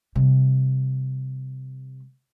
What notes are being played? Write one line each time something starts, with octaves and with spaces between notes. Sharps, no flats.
C3 G3